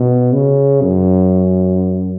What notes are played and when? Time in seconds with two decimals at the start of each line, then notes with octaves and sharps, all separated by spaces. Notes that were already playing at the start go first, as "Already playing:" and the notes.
Already playing: B2
0.33 C#3
0.82 F#2